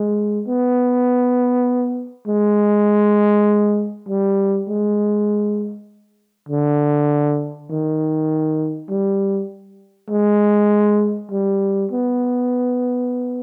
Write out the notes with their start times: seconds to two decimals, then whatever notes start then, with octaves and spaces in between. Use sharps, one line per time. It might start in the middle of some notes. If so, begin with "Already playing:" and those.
Already playing: G#3
0.47 B3
2.27 G#3
4.08 G3
4.68 G#3
6.49 D3
7.70 D#3
8.89 G3
10.10 G#3
11.31 G3
11.92 B3